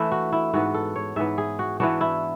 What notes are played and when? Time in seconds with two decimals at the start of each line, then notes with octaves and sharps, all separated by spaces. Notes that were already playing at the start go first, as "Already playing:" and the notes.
Already playing: E3 A3 D4 E4
0.12 F#4
0.32 E4
0.53 G#2 E3 B3 F#4
0.74 A4
0.96 C#5
1.16 G#2 E3 B3 E5
1.38 G#4
1.59 F#4
1.80 E3 B3 D4 F#4
2.01 E4